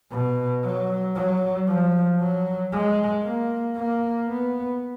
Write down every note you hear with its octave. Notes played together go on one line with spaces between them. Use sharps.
B2
F#3
F#3
F3
F#3
G#3
A#3
A#3
B3